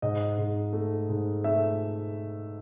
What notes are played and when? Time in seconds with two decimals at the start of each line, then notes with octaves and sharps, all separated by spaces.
0.02 G#2 D#5
0.38 G#2
0.73 A3
1.09 G#2
1.44 A3 E5